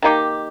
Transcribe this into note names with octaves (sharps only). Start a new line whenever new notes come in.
D#3 A#3 D#4 G4